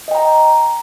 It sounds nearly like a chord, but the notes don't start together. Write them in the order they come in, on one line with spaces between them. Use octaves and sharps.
D#5 G5 A#5